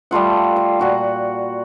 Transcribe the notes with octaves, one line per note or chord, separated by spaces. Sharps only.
G3 A3 F4 F#5
F5
A#2 F#4 F#5